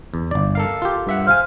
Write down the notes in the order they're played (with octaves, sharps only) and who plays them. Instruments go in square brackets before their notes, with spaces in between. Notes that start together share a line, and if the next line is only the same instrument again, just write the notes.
[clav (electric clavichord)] E2
G1 D5
[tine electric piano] A4 A#4 F5
[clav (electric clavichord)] F4 G4
[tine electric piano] G2 E5 F#5
[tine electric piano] C5 G#5 [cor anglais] F5